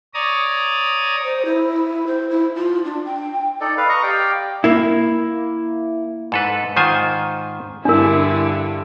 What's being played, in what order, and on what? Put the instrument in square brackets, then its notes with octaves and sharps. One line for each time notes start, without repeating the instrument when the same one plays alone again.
[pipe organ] C#5 D5 A#5 D#6
[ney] C5
E4
C5
E4
F4
D4
G5
[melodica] D#4 A4 D5
B4 F5
D#5 A#5 C#6
G4 D5 F5 G5
[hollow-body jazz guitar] A#3 E4
[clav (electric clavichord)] G#2 A4 B4
G#2 D#3 F4 C5 G#5
[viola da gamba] G2 D3 [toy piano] D4 A#4 [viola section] E4